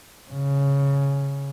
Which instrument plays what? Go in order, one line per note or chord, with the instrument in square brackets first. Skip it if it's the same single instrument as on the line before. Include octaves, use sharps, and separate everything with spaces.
[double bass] C#3